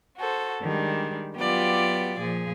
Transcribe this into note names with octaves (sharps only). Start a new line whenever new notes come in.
F#4 A4 C5
D#3 G3 G#3 D4
F#3 B3 F4 G4 D5
A#2 F3 G#4